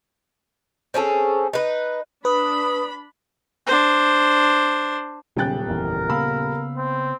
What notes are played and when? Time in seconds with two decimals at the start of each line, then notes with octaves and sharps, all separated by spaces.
0.94 C4 C#4 G#4 A4
1.53 D#4 B4
2.25 D4 B4 B5 D#6
3.67 D4 C5
5.37 D#1 B1 C#3 G5 F#6 A6
5.67 F#1 E2 E3 A#4
6.10 C#3 A#3 B3 F5 B5 E6
6.76 C4